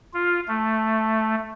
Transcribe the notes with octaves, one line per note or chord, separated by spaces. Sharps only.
F4
A3